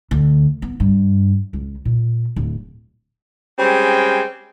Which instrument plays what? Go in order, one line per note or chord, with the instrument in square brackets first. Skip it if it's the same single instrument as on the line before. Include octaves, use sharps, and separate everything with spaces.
[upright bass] D2
B3
G2
C#2
A#2
D1
[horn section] G3 G#3 C4 C#4 G5 G#5